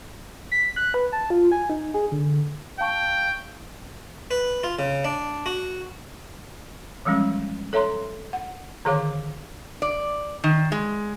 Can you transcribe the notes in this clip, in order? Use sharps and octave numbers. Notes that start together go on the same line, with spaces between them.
B6
F#6
B4
A5
F4
G#5
D#4
G#4
D3
F5 G5 A5 C#6
B4
F4
C#3
D4
F#4
E3 F3 G3 G#3 C#4
A4 C#5 E5 A#5 C6
F#5
D3 D#3 G#4 C#5 F5 D6
D5
D#3
G#3